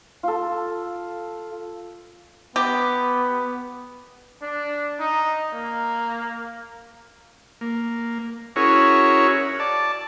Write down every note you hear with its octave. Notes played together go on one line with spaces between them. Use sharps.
F4 A4
B3 G4
D4
D#4
A#3
A#3
C#4 E4 F#4 G#4 A#4 C#5
D5 A5